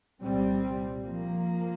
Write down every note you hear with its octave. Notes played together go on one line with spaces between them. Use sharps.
C2 A#2 G3 C4
F3 A#3